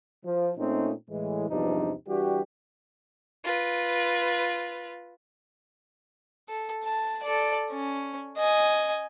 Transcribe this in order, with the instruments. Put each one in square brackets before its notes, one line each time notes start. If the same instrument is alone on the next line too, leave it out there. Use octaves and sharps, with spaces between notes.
[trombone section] F3
A#2 A3 C4 C#4 D#4
A2 E3 G#3
E2 G2 C3 F3 D4 D#4
E3 G3 D4 F#4 G4
[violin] F4 B4
[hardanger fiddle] A4
A5
A4 D5
C#4
D#5 G#5